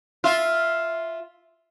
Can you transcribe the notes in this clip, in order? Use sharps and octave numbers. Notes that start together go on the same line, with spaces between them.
F4 E5